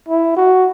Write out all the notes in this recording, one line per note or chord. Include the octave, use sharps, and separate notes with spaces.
E4
F#4